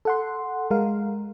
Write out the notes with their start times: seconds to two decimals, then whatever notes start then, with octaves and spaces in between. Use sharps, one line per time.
0.05 A4 F#5 C6
0.71 G#3 A#4 F5